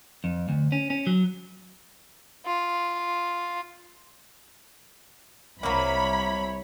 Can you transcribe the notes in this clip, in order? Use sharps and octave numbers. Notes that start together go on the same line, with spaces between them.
F2
D2
C#4
C#4
F#3
F4
C2 F#3 A#3 E4 C#5 B5